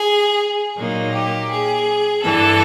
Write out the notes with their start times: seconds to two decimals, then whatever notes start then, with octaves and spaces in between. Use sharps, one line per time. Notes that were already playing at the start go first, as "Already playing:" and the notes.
Already playing: G#4
0.77 A#2 F#3 A#3 D#4
1.13 G4
1.51 G#4
2.23 G2 E3 G3 A4